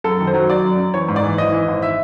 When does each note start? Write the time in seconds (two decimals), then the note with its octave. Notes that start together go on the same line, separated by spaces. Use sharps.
0.04 F#2 A4
0.20 D#3
0.27 C5
0.34 F#3
0.50 F#3 D5
0.64 F#2
0.78 F#2
0.94 E3 C#5
1.09 G#2
1.16 D5
1.23 E3
1.38 G#1 D#5
1.52 E3
1.68 G#1
1.82 E5